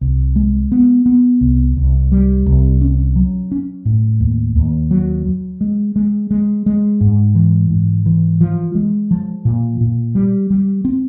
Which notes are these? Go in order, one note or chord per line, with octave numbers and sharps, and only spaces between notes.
C2
G#3
B3
B3
C2
C2
G3
C2
C#4
F#3
C#4
A2
D#2
D#2
F#3
F#3
G#3
G#3
G#3
G#3
G#2
E3
G#2
E3
F3
G#3
F3
A#2
A#2
G3
G3
C4